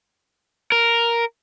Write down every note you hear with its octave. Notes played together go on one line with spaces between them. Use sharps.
A#4